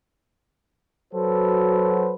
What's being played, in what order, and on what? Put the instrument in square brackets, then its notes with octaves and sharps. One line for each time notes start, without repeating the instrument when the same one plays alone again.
[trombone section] F#3 F#4 A4 B4 C5